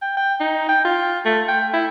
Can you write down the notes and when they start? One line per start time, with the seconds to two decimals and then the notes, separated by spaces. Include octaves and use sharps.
0.02 G5
0.17 G5
0.40 D#4
0.69 G5
0.85 F4
1.25 A3
1.49 G5
1.73 E4